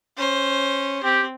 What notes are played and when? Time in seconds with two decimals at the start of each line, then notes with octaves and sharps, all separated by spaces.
0.17 C#4 C5
1.04 C4 G4